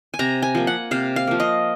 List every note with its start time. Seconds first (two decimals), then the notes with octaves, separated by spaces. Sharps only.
0.14 G#5
0.19 C3 A#5
0.42 G#5
0.55 F3 A#3
0.67 F#5
0.91 C3 F5
1.16 F5
1.27 F3 A#3
1.40 D#5